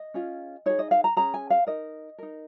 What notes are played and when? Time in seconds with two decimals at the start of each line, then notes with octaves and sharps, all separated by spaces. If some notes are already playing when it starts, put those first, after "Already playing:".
Already playing: D#5
0.14 C#4 F4 G#4
0.66 D#4 G#4 C#5
0.79 D#5
0.91 F5
1.04 A#5
1.17 C#4 G#4 A#5
1.34 G#5
1.50 F5
1.67 D#4 A#4 D#5
2.18 D#4 A#4